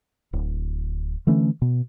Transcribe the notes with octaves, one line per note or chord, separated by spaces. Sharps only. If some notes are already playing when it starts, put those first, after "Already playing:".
D1
D3 E3 A3 C#4
B2